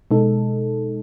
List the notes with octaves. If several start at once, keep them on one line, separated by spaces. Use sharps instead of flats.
B2 G#3 D#4 A4